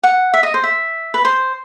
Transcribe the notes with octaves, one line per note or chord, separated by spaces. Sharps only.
F#5
E5
D#5
C5
E5
B4
C5